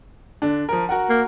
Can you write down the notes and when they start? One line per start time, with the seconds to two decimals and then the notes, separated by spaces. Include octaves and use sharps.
0.42 D3 D4
0.69 F3 A#4
0.89 F#4 A#4 F#5
1.09 A#3